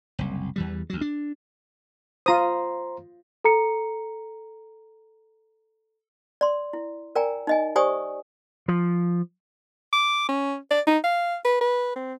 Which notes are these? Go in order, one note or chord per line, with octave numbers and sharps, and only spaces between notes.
F#1 C2
E2 E3 G3
D2 F#3
D4
F4 C5 A#5 C6 D#6
A4 A#5 C#7
D5 C6
E4
A#4 D5 G5 G#5 A#5
D#4 D#5 G#5
G4 C5 D5 G#5 C#6 D#6
F3
D6
C#4
D5
D#4
F5
B4
B4
C4